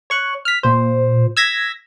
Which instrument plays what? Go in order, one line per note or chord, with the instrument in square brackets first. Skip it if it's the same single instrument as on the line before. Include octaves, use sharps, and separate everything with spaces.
[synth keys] C#5 C#6 F#6
F6 B6
A#2 C5
E6 G#6 A#6 B6